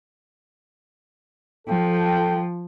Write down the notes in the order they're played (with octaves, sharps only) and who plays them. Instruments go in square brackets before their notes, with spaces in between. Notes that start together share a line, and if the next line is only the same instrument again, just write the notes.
[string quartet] F3 [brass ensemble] A4 G5